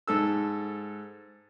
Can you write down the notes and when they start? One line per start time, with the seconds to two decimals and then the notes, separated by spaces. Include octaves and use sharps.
0.07 G#2 A4 E6